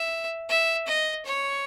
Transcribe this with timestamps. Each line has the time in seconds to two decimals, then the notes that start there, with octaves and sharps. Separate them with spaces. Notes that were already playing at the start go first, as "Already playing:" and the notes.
Already playing: E5
0.49 E5
0.87 D#5
1.25 C#5